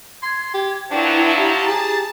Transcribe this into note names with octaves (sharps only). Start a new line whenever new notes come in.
C6 G#6
G4
F3 F#3 D4 E4 B4 G5
G4 A5 A#5
G#4